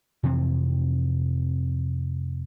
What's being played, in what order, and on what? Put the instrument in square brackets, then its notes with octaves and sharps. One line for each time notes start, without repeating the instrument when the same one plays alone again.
[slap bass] F2 C3 E3 C4